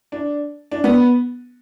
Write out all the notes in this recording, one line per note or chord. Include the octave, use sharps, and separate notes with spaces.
D4
D4
B3